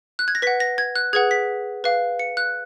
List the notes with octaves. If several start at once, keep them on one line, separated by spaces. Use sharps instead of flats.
F#6
G#6
A#6
B4 F#5 B6
A#6
G#6
F#6
G#4 B4 F#5 G#6
B6
B4 F5
C#7
F#6